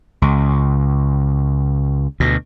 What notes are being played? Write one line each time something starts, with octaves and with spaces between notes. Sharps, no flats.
C#2
D2 B2